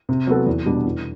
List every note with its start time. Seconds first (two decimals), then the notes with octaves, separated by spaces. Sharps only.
0.09 C3
0.27 F#3 B3 F#4 A4
0.46 E2
0.66 B2 G3 D4
0.85 E2